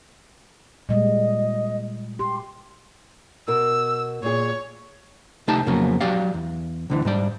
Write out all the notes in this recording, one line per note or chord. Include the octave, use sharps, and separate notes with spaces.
A#2 G3 G#3 D#5
G4 C6
B2 A#4 E6
A#2 G#4 C#5
C2 A3 D#4 G4 A5
F2 C#3 F#3 A#3 B3
F#3 F#4 G4 D5 F5
E2
D2 D3 E3
G#2 G3 D5